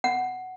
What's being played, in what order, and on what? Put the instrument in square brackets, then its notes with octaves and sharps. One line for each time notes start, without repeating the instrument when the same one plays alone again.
[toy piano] F#5